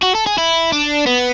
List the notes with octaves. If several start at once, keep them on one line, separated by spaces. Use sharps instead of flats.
F#4
A4
G#4
E4
D4
B3